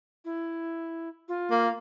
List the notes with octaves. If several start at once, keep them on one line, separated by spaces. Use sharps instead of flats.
E4
F4
A#3